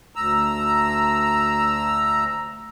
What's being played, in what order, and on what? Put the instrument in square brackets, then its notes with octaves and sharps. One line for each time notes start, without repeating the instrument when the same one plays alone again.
[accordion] D2 A#5 E6